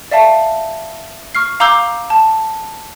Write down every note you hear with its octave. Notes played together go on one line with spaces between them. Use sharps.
D5 E5 F5 A5
C#6 F6 C7
F5 A#5 D6 E6 G6 G7
A5